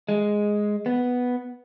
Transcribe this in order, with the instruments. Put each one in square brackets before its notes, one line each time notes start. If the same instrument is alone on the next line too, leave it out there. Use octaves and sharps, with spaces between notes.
[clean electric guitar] G#3
B3